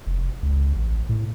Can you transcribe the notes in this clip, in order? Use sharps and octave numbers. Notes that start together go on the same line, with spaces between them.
F1
C#2
A1
A2